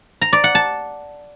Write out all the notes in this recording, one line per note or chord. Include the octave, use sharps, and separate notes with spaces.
A#5
D5
F#5
A5